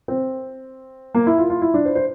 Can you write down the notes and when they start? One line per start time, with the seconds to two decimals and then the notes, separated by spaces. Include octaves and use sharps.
0.08 C4
1.14 A#3
1.27 E4
1.38 F4
1.50 F4
1.62 E4
1.74 D4
1.85 C5
1.95 C5